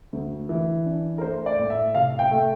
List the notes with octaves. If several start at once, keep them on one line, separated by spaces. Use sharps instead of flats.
D2
E3
D4
A#4
A3 C5
D5
A2
E5
C3 F5
G5
A3